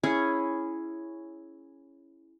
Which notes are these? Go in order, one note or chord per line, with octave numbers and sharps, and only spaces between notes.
C#4 E4 G#4 C#5